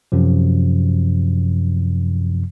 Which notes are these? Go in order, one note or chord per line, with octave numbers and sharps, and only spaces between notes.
F#2 C3 F3